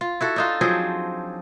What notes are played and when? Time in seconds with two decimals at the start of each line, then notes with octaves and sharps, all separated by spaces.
0.01 F4
0.21 E4 F#4 A4
0.36 D4 D#4 F4
0.61 F3 F#3 C4 G#4